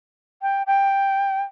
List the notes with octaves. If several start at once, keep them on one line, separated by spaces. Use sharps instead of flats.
G5
G5